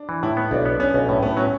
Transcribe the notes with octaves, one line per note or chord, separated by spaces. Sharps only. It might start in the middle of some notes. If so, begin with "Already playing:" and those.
Already playing: D4
E3
A2 E4
B3
B1 D4
B3
B3 C#4
B1 C#4
A2 C#4
A2 B3
F#3 C#4